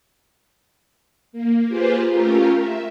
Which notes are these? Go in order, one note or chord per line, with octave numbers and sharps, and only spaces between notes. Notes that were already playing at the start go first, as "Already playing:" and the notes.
A#3
A#3 F4 G4 G#4 B4 C5
A3 C#4 F4 G4 A#4
E5